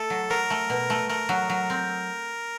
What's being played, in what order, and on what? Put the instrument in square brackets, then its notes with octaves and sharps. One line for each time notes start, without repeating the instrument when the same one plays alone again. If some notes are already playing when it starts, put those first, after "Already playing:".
Already playing: [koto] A3 [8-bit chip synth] A4
[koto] F#3
[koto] F#3 [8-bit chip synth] A#4
[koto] A3
B2
A3
[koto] A3 [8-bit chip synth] A#4
[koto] F#3
F#3
C4